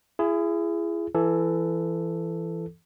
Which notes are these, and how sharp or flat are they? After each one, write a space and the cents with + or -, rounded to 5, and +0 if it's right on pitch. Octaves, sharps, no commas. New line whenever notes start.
E4 +35 G#4 +0
E3 +20 A4 +0